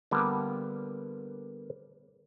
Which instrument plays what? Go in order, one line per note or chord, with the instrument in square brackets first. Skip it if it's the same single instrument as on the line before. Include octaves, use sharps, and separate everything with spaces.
[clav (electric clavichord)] D3 G3 A#3 B3